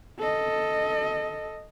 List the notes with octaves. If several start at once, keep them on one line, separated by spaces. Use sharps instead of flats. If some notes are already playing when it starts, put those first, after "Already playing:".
A4 D#5